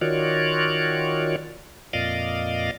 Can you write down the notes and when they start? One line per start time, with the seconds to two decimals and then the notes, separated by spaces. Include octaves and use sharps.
0.01 D#3 F4 F#4 C#5 D5
1.93 F2 A#2 D5 D#5 F5